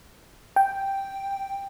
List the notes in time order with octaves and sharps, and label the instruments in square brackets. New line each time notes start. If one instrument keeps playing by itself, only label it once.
[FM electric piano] G5